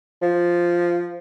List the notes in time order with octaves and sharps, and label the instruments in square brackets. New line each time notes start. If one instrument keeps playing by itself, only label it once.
[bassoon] F3